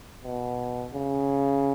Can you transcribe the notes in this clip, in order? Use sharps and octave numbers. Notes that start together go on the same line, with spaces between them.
B2
C#3